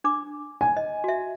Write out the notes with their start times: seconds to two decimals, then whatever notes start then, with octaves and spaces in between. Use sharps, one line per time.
0.04 D4 D6
0.61 G#5
0.77 D#5
1.04 F#4 E5